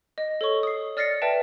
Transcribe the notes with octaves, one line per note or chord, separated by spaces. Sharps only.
D#5
A4 C#5 C#6
D#6 C7
D5 F6 A6 A#6 C7 C#7
B4 D5 E5 G5 A5